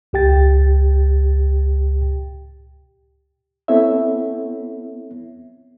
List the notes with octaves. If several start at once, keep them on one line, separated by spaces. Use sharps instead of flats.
C#2 G4 G5 A6
B3 C4 E4 A4 C#5 E5